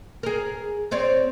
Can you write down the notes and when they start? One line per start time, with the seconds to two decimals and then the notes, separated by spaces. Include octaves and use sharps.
0.23 G#4 A#4
0.91 C4 C#5 D5